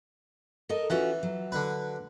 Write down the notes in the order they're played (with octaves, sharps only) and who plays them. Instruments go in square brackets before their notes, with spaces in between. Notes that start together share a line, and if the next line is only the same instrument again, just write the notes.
[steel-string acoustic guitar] A4 A#4 D#5
[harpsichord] E3 [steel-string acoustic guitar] C#4 F4 F#4
[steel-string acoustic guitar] F#3
[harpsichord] D3 B4